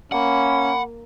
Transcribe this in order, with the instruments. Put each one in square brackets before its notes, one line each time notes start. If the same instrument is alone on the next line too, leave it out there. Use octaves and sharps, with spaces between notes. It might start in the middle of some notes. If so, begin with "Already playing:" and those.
[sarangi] A#3 [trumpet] C#4 [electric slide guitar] F#5 [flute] B5